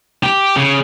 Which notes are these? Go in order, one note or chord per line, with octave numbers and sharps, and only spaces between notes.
G4
C#3